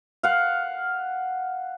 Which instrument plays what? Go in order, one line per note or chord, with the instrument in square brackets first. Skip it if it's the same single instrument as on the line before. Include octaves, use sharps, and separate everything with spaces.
[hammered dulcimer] F5 F#5